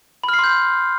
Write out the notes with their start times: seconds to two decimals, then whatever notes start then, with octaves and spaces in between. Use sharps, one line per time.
0.24 B5
0.29 F6
0.34 C7
0.39 C6
0.44 G6